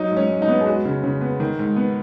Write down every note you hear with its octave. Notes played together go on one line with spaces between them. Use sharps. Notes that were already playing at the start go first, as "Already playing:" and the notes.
Already playing: F#3 D#4
G#2
C#4
G#2
D#4
B3
G#4
G#3 F#4
C#3
C#3
B3
D#3
G#2
B3